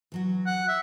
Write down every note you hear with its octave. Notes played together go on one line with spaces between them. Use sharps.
E3 F#3 F#4
F#5
E5